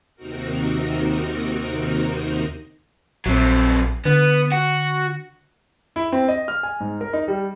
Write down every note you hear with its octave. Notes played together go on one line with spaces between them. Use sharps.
D#2 C3 C4 D#4 F#4 A#4
A#1 F#3 C4
D3 B3
F#4
E4
C4
D#5
F6
G#5
G#2
A#4
D#4
G3